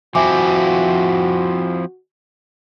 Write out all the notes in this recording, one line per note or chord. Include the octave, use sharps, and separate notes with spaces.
F3 C4 E4 F#4 E5 G#5 D6